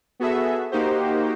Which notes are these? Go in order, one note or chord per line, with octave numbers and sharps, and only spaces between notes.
B3 F#4 G#4 A4 E5
A#3 D#4 F#4 G4 C5